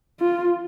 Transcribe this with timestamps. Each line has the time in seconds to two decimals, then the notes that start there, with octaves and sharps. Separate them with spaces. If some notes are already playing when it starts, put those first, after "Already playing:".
0.20 F4